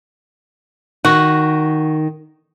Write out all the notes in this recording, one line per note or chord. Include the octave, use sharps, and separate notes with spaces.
D#3 F#4